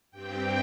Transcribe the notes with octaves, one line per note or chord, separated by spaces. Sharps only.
G2 G3 C4 G5